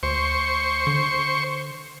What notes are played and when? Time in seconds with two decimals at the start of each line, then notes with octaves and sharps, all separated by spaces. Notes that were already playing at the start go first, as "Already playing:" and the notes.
0.03 D2 C5 C#6
0.87 D3